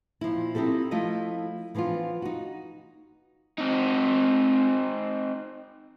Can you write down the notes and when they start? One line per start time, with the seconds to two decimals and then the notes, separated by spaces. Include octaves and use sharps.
0.21 A#2 F3 D#4 E4
0.55 C4 D#4 E4 G4 A4
0.91 F3 A3 E4 F4 D#5
1.75 E3 F3 B3 D4 F4
2.22 D#4 F#4
3.58 C4 D#4